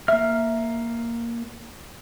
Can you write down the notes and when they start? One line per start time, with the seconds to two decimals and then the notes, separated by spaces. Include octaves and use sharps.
0.08 A#3 E5 F6